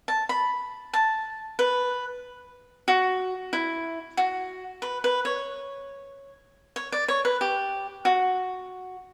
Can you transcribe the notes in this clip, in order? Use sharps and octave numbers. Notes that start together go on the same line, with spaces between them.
A5
B5
A5
B4
F#4
E4
F#4
B4
B4
C#5
C#5
D5
C#5
B4
G4
F#4